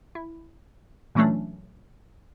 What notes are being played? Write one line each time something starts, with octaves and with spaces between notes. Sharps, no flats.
E4
A#2 E3 F#3 A3 C#4 D4